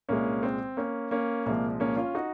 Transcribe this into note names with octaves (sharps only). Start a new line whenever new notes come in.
C2 A#2 G#3 A#3 C#4
C4
A#3 C#4
A#3 C#4
C2 A#2 F3 G#3 A#3
A#3 C#4
C#4 F4
D#4 F#4